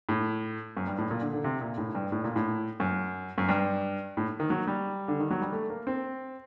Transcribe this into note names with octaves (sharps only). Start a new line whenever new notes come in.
A2
F#2
G2
A2
A#2
D3
D3
C3
A#2
A2
G2
A2
A#2
A2
F#2
F#2
G2
A2
D#3
F#3
G3
D3
D#3
F#3
G3
A3
A#3
C4